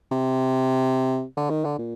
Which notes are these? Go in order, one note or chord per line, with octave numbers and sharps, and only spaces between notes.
C3
D3
D#3
D3
A#2